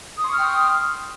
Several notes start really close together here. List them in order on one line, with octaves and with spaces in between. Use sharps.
D#6 C6 C#6 F6 G5